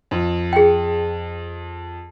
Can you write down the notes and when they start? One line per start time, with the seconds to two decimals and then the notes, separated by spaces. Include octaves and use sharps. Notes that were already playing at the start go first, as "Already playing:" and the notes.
0.11 F2
0.53 G#4 G5